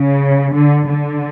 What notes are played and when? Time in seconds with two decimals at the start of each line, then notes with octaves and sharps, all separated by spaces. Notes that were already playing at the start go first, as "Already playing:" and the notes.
Already playing: C#3
0.54 D3
0.88 D3